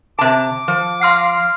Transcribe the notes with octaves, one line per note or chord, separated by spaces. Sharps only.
C3 A5 D6
F3
F5 C6 F6 C7